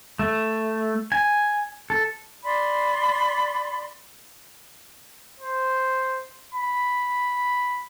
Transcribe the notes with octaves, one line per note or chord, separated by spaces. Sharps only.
A3
G#5
A4
D5 B5 C6
C5
B5